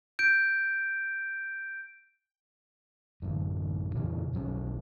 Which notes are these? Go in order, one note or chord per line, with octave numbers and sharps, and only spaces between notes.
G6 D7
A1 F#2
F2 A#2 C#3 E3
E1 B1 F#3 C#4